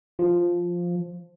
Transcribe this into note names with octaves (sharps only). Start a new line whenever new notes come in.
F3